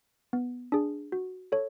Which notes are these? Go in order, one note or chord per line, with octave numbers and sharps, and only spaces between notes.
B3
D4 G#4
F#4
A4 C#5